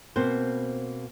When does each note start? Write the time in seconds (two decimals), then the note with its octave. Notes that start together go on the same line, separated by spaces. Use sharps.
0.16 B2 A#3 C4 C5